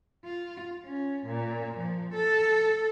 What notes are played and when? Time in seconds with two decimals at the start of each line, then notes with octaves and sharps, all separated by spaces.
0.25 F4
0.85 C#4
1.26 A#2
1.77 F3
2.14 A4